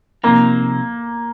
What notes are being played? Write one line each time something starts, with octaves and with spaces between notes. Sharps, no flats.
C3 F3 A#3 C4 D#4